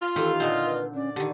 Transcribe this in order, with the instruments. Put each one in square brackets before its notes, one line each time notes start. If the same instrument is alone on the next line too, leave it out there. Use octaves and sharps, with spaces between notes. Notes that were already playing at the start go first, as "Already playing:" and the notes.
[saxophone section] F4
[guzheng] D#3 E3 C4 [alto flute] G4 [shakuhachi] A4
[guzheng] A#2 D3 C4 [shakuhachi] D#5
[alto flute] B4
[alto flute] C#4 [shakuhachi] D5
[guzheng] D3 D#3 [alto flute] G4